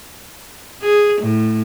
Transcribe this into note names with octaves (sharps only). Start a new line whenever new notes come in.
G#4
A2